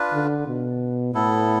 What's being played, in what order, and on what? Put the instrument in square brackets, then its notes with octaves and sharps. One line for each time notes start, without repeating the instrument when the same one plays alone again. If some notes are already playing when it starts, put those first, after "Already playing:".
Already playing: [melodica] D4 F4 B4
[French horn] D3
B2
[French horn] A2 [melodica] B3 E4 A4